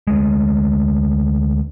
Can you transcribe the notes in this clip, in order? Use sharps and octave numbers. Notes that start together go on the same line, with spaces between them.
D2 G#3